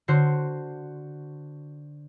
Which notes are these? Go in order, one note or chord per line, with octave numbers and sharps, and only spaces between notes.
D3 F#4 C5